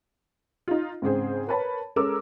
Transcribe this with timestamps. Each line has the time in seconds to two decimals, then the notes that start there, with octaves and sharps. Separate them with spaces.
0.68 D#4 F4
1.02 G#2 C#3 C4 G#4 C5
1.48 A#4 B4 C#5 A5 B5
1.96 G#3 C#4 A4 A#4 D6 E6